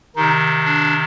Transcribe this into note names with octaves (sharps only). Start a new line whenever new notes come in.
C3 D#3 D#4
D4